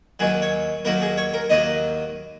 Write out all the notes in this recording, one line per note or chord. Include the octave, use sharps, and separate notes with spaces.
D#2 D#3 F#3 G#4
C#5
D#2 D#3 F#3 A#4
G#4
C#5
A#4
D#2 D#3 F#3 D#5